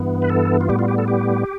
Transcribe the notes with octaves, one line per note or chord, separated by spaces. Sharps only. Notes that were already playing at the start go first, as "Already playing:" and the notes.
Already playing: G2 E3 B3
B4
A4
F4
A2 G3 B3 G4
F4
G4
A4
G4